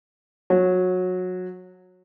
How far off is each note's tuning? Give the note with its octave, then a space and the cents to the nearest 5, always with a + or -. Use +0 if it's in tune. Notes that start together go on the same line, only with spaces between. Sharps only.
F#3 -20